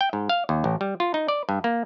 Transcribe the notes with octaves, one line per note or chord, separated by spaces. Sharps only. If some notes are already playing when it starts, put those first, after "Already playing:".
G5
G#2
F5
D#2
A1
G3
F4
D#4
D5
G2
A#3